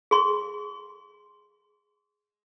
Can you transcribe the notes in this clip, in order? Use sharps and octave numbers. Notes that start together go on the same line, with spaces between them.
G#4 C6